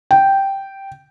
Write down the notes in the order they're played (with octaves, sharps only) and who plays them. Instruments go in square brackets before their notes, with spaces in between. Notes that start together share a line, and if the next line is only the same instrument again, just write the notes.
[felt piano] G5